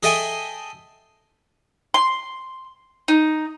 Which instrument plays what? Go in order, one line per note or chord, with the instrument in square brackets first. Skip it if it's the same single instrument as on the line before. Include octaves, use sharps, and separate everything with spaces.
[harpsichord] G#4 A4 D#5 E5 G5 G#5
[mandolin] C6
D#4